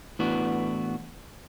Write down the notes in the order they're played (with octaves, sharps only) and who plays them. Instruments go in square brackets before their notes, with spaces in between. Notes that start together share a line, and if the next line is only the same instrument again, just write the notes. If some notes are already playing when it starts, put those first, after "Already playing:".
[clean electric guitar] A2 E3 B3 D4 F#4